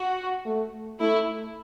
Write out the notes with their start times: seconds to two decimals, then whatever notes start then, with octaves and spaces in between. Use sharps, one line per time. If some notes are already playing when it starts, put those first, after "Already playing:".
Already playing: F#4
0.46 A3
1.00 A3 E4